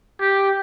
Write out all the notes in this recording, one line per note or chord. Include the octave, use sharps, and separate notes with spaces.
G4